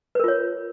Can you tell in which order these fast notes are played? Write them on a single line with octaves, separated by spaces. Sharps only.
B4 A#4 F4 C#5